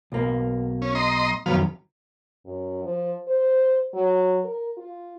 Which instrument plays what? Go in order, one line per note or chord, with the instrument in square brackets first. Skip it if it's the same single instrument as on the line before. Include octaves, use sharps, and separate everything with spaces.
[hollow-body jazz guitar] B1 A#3
[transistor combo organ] C#4
D#5 A#5 C6
[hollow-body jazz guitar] F2 D#3 F#3 [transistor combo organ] B3 F5
[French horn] F#2
F3
C5
F#3
A#4
F4